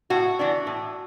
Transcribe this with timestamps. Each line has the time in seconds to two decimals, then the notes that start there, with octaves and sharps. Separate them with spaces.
0.10 A2 F#4
0.39 E3 B3 D4
0.67 A2